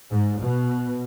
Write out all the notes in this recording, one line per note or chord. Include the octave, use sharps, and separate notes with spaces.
G#2
B2